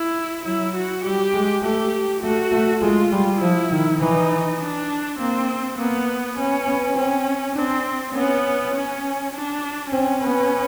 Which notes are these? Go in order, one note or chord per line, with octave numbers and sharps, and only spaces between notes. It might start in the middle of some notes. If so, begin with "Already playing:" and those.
Already playing: E4
F#3 E4
F#4
G3 G4
G#3
A3 G4
A3 F#4
A3
G#3 F4
G3
F3 E4
D#3
E3 D#4
D4
A#3 C4
A#3 B3
B3 C#4
B3
C4 C#4
C4 D4
B3 C#4
C#4
D4
C4 C#4
B3